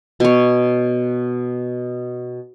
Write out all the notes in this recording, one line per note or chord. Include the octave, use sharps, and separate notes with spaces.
B2 C#5